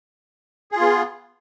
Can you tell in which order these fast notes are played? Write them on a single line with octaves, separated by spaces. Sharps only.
G#4 F4 B3